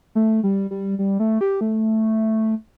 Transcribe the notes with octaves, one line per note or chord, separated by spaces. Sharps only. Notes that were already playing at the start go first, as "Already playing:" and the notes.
A3
G3
G3
G3
A3
G4
A3